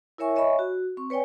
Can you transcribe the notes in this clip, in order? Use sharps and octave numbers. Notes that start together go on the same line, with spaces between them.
E4 A#4 C#5 E5 G#5 C#6
C#5 D#5 E5 G#5 B5 C#6
F#4
C4 C#6
B4 C#5 D5 G5 G#5